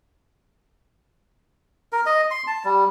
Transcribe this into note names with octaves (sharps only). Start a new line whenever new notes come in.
A#4
D#5
C6
A5
G3